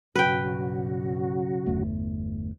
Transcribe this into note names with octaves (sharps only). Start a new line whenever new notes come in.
B1 G2 C#3 F#3 F#4 B4 G5
G1 E2 A3